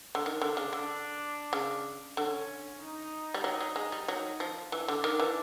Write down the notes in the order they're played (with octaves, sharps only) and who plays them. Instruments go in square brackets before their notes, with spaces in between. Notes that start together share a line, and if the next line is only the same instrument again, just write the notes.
[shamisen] D3
[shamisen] D#3 [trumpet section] D4
[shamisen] D3
C#3
D3
C#3
[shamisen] D3 [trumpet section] C#4
[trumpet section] D#4
[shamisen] G3
F#3
F#3
G#3
G3
F#3
F3
[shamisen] E3 [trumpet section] D4
[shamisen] D3
D#3
E3